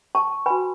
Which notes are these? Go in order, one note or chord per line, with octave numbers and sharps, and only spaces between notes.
A5 C#6
F#4 B4 G#5 B5